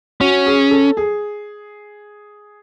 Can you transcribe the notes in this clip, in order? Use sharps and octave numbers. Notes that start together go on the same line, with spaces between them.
C#4 F#4
G#4
A4
G#4